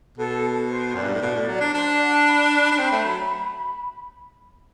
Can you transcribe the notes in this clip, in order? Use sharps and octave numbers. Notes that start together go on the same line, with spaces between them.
B2 A4
C5
F#2 D5
G2
A2
B2
A2
F#3
D4
D4 C5
D5
F#5
A5
B5
D4
C4
A3
F#3